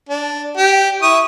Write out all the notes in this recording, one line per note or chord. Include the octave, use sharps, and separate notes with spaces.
D4
G4
E4 C#6 D#6